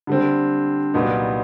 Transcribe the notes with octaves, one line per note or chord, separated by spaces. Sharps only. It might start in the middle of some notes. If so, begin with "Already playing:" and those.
D3 G3 C4
C2 A#2 F#3 B3 D#4